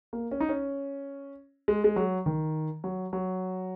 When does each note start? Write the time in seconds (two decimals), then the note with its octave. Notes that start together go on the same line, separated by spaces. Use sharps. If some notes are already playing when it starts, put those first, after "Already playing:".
0.13 A#3
0.31 C#4
0.40 D#4
0.49 C#4
1.68 G#3
1.84 G#3
1.96 F#3
2.26 D#3
2.84 F#3
3.13 F#3